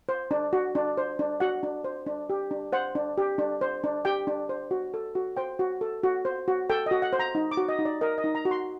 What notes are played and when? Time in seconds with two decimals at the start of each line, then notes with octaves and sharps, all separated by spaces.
0.09 C5
0.31 D4
0.53 F#4
0.75 D4
0.97 C5
1.19 D4
1.40 F#4 F#5
1.63 D4
1.84 C5
2.06 D4
2.30 G4
2.51 D4
2.73 C5 F#5
2.95 D4
3.18 G4
3.38 D4
3.61 C5
3.84 D4
4.05 G4 G5
4.27 D4
4.49 C5
4.71 F#4
4.94 A4
5.15 F#4
5.37 C5 G5
5.59 F#4
5.81 A4
6.04 F#4
6.25 C5
6.48 F#4
6.70 A4 G5
6.86 D#5
6.91 F#4
7.02 F#5
7.13 C5
7.19 A#5
7.35 D#4
7.51 D6
7.57 F#4
7.69 D#5
7.79 D#4
7.85 D5
8.01 A#4 D#5
8.18 D#5
8.24 D#4
8.35 A#5
8.45 F#4
8.51 C6